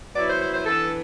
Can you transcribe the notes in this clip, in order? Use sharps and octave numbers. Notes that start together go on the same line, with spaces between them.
F#3 B3 E4 D5
C5
C5
C5
E3 B3 D4 A4